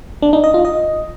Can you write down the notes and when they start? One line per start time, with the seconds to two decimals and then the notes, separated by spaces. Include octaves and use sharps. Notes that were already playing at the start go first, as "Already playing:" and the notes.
0.22 D4
0.33 D#4
0.44 D#5
0.54 F4
0.65 D#5